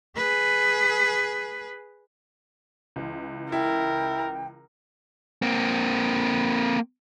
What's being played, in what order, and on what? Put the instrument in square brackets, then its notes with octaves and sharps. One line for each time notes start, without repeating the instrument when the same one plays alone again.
[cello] G#4 B4
[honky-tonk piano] C#2 E3
[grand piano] E4 [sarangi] A#4 [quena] G5
[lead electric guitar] A#3 C4